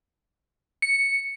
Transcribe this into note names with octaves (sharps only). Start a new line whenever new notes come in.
C#7